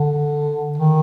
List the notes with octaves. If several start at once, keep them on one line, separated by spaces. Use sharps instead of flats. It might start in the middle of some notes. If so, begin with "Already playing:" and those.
Already playing: D3
D#3